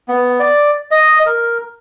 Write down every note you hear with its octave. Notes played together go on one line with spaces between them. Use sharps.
B3
D5
D#5
A#4